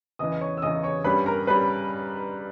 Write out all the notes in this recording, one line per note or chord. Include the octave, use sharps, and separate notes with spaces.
E2 C#3 E3 D#5 D#6
C#5 C#6
E6
E2 C#3 E3 D#5 D#6
C#5 C#6
G2 G3 C#4 B4 B5
A#4 A#5
G3 C#4 B4 B5